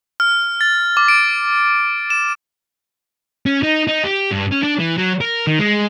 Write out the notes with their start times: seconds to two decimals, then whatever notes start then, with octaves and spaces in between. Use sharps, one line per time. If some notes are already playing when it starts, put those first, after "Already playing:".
0.20 F6
0.61 A6
0.97 D6
1.08 D7
2.10 E7
3.46 C#4
3.63 D#4
3.88 D#4
4.04 G4
4.32 G2
4.52 C#4
4.63 D4
4.79 E3
4.98 F#3
5.21 A#4
5.47 D#3
5.59 G#3